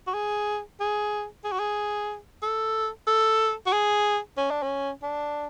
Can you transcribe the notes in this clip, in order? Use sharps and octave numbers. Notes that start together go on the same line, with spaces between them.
F#4
G#4
G#4
G#4
F#4
G#4
A4
A4
F#4
G#4
C#4
D4
C#4
D4